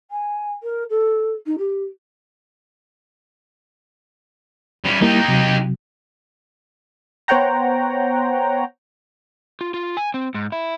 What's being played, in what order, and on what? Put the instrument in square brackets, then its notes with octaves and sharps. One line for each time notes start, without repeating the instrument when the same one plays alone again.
[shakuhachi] G#5
A#4
A4
D#4
G4
[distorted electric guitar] G3 C#4
[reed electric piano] G3 A#3 E4 [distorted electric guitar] D#4 G4
[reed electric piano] C3 F#3
[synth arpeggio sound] B3 C5 C#5 F#5 G5 A#5
[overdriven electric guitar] F4
F4
G#5
C4
G#2
E4